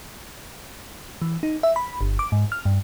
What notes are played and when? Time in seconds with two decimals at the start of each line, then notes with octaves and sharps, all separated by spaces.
1.22 E3
1.43 D#4
1.63 E5
1.76 B5
2.01 G1
2.19 D6
2.32 G#2
2.52 F6
2.65 G2